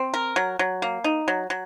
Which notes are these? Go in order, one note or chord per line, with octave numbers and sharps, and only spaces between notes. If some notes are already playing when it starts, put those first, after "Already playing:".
Already playing: C4
A#4
F#3
F#3
A#3
D#4
F#3
F#3